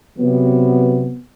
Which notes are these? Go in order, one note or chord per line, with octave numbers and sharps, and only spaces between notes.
C3 F#3 B3